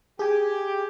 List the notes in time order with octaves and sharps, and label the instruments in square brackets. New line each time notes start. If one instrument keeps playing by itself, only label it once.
[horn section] G4 [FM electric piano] G#4 G#5